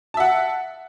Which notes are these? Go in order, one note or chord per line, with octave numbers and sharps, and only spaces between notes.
E5 F#5 A5